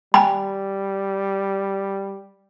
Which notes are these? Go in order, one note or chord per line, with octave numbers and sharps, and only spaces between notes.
G3 G5 G#5 B5